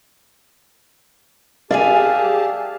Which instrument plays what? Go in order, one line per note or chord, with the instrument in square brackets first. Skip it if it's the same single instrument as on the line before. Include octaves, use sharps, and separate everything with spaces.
[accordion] G4 G#4 A5 [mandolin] D5 E5 G#5 [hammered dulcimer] F5